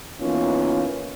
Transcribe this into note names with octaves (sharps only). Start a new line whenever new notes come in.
E3 A#3 B3 C#4 D#4 F4